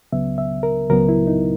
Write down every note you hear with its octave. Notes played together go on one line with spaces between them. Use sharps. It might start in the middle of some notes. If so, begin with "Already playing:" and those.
C#2 C#3 F#3 B3 E5
E5
A#4
C#2 C#3 F#3 B3 A#4
E4
D#4